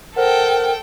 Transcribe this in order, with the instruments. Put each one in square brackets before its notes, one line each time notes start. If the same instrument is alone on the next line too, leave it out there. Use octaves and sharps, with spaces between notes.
[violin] A4 G5 [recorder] A#4 [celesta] C5 F#5